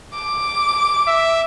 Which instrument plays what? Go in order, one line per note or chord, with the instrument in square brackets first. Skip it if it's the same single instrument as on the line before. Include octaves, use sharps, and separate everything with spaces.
[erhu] D6
[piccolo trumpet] E5